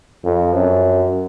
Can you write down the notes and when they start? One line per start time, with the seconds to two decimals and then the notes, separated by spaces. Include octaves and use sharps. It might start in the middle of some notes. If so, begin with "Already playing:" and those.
0.24 F2
0.53 F#2